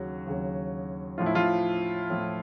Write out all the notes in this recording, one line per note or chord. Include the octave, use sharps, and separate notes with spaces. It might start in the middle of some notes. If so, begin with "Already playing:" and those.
Already playing: D#2 C#3 F#3 F#4
D#2 C#3 F#3
A2 F3 F4
E4
F3 F4
A2 F3